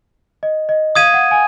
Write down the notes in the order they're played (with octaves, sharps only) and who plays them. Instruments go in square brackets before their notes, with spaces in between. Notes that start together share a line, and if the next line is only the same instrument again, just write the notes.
[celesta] D#5
D#5
[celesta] F5 [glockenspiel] D#6 G#6 D#7
[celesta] F#5
G#5